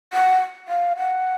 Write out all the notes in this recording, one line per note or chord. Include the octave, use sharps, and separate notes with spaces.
F#5
F5
F#5